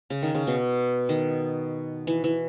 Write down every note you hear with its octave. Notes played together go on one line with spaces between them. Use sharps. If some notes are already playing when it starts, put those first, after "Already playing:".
C#3
D#3
C#3
B2
D#3
E3
E3